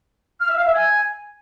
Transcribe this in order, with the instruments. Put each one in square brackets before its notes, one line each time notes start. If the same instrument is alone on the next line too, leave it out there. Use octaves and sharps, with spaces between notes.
[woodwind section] F6
E5
F5
E5
G#5